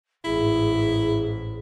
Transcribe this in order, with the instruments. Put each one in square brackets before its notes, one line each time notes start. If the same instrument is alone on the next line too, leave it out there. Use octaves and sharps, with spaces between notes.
[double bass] A1 G#2 [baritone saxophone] E4 [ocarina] G#4